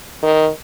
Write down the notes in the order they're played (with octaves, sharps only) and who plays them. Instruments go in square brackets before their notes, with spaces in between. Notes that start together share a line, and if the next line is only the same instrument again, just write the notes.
[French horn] D#3